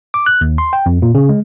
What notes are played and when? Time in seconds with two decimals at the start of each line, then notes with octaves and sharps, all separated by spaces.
0.14 D6
0.26 F#6
0.41 D#2
0.58 C6
0.73 G5
0.86 F2
1.02 A#2
1.15 C#3
1.29 G#3